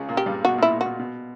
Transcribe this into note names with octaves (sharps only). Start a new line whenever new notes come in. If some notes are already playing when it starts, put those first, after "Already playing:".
Already playing: C#2 C#3
A#2 A#3
G4
G2 G3
B2 F#4
A#2 E4
A#2
F#4
A#2
B2